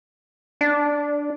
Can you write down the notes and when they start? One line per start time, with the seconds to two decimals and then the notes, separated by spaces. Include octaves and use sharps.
0.61 D4